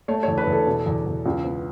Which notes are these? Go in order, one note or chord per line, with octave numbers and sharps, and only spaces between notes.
A3 C#5
C#5
E2
B4
E2
A4
B2
E2
E2
C#2
B3